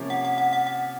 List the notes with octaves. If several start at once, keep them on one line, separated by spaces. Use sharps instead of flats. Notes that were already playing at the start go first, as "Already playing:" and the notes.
Already playing: C3 F3 A#3 C#4
F#5
F#5
F#5
F#5
F#5